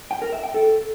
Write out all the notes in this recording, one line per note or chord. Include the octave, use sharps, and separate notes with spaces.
G5
A#4
E5
G5
A4